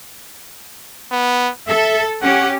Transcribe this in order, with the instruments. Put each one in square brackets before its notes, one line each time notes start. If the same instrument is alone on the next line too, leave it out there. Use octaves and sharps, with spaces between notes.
[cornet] B3
[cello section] A4 [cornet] E5
[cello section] C#4 G4 [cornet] F#5